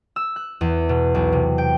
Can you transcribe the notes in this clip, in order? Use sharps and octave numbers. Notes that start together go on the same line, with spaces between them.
E6
F#6
E2
B2
B1
C3
G5